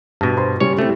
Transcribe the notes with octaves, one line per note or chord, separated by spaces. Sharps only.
G2 B2 A5 A#6
C5 C6
C#3 G3 C#4 C#5
A3 C4 E4 G4